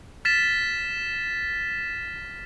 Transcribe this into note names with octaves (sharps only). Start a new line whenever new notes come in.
F6 A6 B6 E7